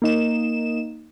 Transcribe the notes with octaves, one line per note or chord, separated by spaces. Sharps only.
A#3 D#4 E7